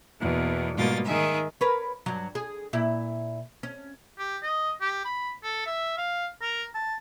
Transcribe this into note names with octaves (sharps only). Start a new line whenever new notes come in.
E2 B2 A#3
G#2 B2 G3 A#3 F4 A6
D#3 G#4 E5
A#4 B4 C#5
G2 F#3
G#4
A#2 E4
C#4
G4
D#5
G4
B5
A4
E5
F5
A#4
A5